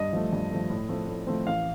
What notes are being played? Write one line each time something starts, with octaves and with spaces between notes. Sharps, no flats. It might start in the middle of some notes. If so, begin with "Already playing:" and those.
Already playing: G2 D#5
F3 A3
G2
F3 A3
A2
F3 A3 C4
A2
F3 A3 C4
A1 F5